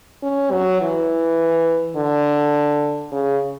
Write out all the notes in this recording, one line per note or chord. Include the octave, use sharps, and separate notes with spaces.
C#4
F#3
E3
D3
C#3